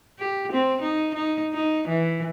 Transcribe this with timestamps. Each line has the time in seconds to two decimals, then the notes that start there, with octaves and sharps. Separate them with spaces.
0.19 G4
0.52 C4
0.81 D#4
1.15 D#4
1.54 D#4
1.88 E3